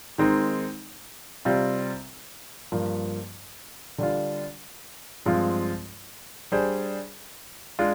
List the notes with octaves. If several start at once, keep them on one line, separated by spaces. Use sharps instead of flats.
D#3 G#3 C4 D#4
C3 G3 C4 F4
G2 F3 A#3
D3 G3 D4 F4
G2 F3 G#3 C4 F4
G3 D4 G#4 C5
G#3 D4 F4